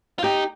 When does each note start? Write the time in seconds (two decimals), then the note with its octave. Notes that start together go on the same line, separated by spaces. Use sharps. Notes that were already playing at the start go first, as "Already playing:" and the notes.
0.19 F4
0.24 D#4 G4